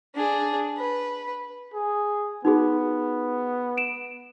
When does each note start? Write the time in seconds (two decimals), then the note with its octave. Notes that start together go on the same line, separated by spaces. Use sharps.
0.15 D4 G#4
0.78 B4
1.74 G#4
2.45 B3 D#4 F#4 G#4
3.77 D7 E7